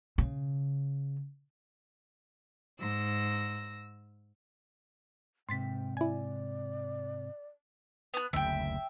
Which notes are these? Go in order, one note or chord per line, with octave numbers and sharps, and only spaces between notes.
C#3
G#2 E6 A#6
G#2 C3 G5 C6 A6 B6
E4 D5 G#5
B3 F#6
F#1 D2 C#3 E5 G5